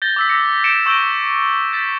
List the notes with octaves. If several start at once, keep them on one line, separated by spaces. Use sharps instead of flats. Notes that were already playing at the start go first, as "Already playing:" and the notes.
G6 A6 A#6 G7
D6 E6 B6
D6 E6 A#6 B6 C#7
G6 C#7 D7 E7
C#6 E6 G6 A#6 D7 G7
G6 A6 B6